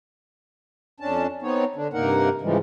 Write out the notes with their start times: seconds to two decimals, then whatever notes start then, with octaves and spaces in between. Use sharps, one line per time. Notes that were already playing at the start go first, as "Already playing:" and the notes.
1.00 F2 C#4 D4 A5
1.42 B3 C4 D#4 C#5
1.76 D3 D4
1.93 G2 C3 A#3 D#4 A#4 F#5
2.41 G#2 C#3 E3 F3 G3 G#3